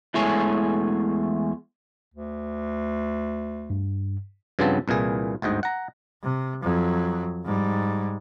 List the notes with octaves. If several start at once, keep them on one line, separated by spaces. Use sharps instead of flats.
E2 E3 G#3 A3 C#5 G#5
D2
G2
G2 C#3 F3 B3 C4 A5
C2 A#2 E3 G#4
G1 D2 G#2 D#5
F#5 A#5
C3
F2 F#3
G#2 G3